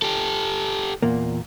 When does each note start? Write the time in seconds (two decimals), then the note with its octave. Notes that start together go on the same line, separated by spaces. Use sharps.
0.02 G4 A4
1.02 E2 A#2 A#3